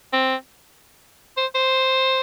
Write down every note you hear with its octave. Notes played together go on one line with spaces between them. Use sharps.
C4
C5
C5